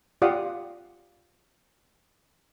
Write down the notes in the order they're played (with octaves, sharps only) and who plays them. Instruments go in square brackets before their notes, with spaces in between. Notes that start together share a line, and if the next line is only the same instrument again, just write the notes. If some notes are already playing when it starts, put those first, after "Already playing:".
[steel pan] F4 G4 D5 F5 F#5 D#6